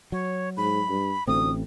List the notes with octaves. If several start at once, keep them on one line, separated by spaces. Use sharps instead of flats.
F#3 C#5
G#2 B5
G2
A1 D2 A3 C4 D#6